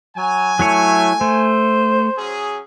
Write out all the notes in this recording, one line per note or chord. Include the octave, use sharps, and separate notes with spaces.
F#3 G#5
F#3 A3 E4 C#5
A3 C5
F#3 C#4 G#4